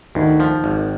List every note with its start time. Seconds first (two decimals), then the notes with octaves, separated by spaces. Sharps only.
0.15 D2 D#3
0.40 F3
0.64 G#1